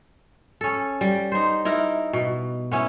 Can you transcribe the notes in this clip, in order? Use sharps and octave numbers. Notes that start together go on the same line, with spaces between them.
C#4 A4
G3
D#4 C5
D#4 E4 A#4
B2
B3 C#4 E4